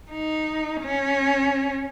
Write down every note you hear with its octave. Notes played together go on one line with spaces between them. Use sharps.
D#4
C#4